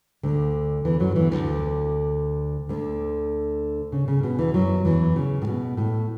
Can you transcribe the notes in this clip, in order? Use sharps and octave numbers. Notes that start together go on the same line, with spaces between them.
D2 D3
E2 E3
F#2 F#3
E2 E3
D2 D3
D2 D3
C#3
C#3
B2
E2 E3
F#2 F#3
E2 E3
C#3
A2
B2
A2